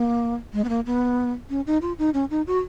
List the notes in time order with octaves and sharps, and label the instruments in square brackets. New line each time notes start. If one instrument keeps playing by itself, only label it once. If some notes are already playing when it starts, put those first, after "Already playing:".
Already playing: [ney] A#3
G#3
B3
A#3
B3
C#4
D#4
F4
D#4
C#4
D#4
F#4